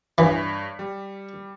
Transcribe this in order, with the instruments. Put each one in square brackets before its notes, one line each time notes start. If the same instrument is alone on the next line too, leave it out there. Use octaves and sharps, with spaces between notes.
[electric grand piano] G2 C#5 B6 [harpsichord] E3
[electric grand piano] G3